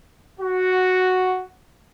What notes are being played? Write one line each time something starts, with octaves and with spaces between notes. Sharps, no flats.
F#4